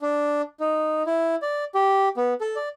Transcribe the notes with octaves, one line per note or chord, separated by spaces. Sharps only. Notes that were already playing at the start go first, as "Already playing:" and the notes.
D4
D#4
E4
D5
G4
B3
A4
D5